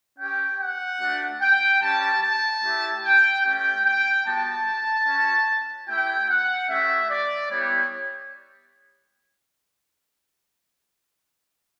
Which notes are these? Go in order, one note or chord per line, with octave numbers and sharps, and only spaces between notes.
C#4 G4 G5
F#5
A3 D4 F#4
G5
G3 C#4 G4 A5
A5
A3 E4 G4
G5
A3 C#4 G4 G5
G5
G3 B3 F#4 A5
C#4 F#4
A3 E4 G4 G5
F#5
A3 C#4 G4 E5
D5
G3 B3 E4 G4 C#5